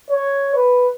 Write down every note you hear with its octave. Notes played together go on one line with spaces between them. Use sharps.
C#5
B4